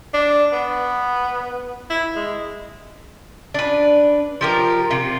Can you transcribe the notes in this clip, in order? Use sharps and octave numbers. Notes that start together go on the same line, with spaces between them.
D4
B3
E4
G#3
D4 B4
F3 G4 A#4
C3 F4